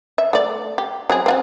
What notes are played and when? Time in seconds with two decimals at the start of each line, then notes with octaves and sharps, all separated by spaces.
0.18 E5
0.33 A3 D5
0.78 G4
1.10 F#3 C4 G#4
1.26 C4 F4 F#4